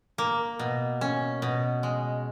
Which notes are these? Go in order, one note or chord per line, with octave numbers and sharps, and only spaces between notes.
A#3
B2
C#4
B2
G#3